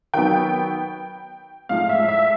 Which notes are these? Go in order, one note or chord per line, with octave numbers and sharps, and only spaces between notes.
D#3 F#3 B3 G5
A2 F3 G#3 F5
E5
E5